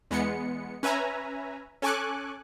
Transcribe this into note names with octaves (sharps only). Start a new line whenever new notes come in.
E2 G#3 B3 C#7
C#4 B4 E5 G#5 A#5
C#4 A4 G#5 C#6 D6 F#6